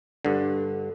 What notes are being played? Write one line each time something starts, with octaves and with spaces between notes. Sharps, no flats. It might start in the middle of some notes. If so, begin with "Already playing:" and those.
G2 D3